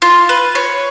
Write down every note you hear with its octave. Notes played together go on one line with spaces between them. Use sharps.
F4
B4
C#5